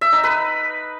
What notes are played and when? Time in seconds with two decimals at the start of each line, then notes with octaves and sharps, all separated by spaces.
0.01 E5
0.13 D#4
0.24 B4